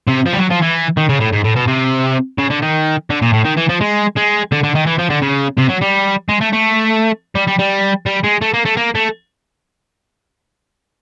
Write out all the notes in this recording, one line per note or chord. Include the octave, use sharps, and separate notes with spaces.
C3
F3
G3
F#3
F3
E3
D#3
C#3
A2
G#2
A2
B2
C3
C#3
D3
D#3
D3
A#2
A2
D#3
E3
F3
G#3
G#3
D3
D3
D#3
E3
F3
D3
C#3
C3
F#3
G3
G#3
A3
A3
G3
G3
G3
G3
G#3
A3
A#3
A3
A#3
A3